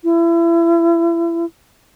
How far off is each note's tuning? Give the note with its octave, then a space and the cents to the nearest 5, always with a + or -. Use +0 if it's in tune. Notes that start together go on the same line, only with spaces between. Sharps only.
E4 +30